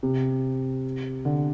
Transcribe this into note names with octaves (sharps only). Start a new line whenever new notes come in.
C3
D3